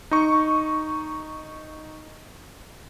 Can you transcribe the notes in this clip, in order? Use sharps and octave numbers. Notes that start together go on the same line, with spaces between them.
D#4 C#6